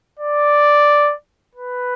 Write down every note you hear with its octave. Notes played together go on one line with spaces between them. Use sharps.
D5
B4